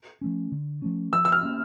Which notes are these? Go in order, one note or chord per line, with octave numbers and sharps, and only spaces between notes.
F3 A3 C#4
D3
F3 A3 C#4
F3 E6
E6
F6
A#3 C#4